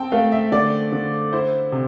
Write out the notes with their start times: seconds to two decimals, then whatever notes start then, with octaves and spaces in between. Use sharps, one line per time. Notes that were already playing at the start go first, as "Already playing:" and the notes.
Already playing: C4 G5 A5
0.12 A3 F5
0.32 E5
0.52 D3 D5
0.92 D3
1.32 E4 C5
1.72 C3